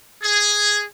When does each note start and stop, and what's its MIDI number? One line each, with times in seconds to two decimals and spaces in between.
0.23 0.83 68